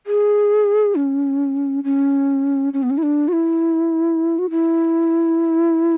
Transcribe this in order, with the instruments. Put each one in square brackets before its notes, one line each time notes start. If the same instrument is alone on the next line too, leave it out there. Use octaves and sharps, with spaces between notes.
[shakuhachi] G#4
C#4
C#4
C#4
B3
C#4
E4
D4
F#4
E4
F#4
E4